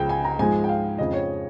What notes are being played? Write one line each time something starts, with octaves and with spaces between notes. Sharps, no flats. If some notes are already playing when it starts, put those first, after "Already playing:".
Already playing: C#2 C#3 F3 G5
G#5
A#5
G#2 F3 G#3 G#5
G5
F5
F2 C#3 F3 D#5
C#5